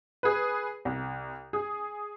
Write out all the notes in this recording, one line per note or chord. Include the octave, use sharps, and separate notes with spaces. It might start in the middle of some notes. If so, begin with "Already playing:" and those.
G#4 B4
C2
G#4